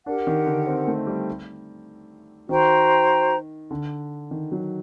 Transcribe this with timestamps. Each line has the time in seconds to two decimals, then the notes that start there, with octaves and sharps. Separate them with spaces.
0.06 D4 G4 A#4 F#5
0.27 D#3
0.46 D3
0.67 C4
0.88 A3
1.07 G3
2.49 D#3 F#4 C5 G5 A#5
3.71 D3
4.31 D#3
4.52 F#3